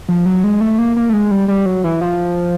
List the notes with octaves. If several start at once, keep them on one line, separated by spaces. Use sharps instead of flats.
F3
F#3
G#3
A3
A#3
A#3
A3
G#3
G3
G3
F#3
E3
F3